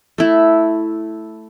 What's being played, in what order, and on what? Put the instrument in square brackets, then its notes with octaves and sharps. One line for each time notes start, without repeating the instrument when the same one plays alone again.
[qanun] A3 E4